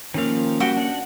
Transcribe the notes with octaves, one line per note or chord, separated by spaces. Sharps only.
D#3 F3 A#3 C#4 F5
G3 F#4 G5
D4 F#5